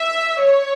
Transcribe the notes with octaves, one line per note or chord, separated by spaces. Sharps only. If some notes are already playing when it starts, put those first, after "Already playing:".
Already playing: E5
C#5